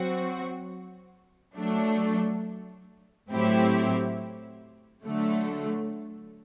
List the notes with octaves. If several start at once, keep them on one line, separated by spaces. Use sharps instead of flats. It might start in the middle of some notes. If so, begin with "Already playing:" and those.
Already playing: F#3 C4 F#4
F#3 A3 D4
A2 F#3 C4 E4 G4
D3 F#3 A3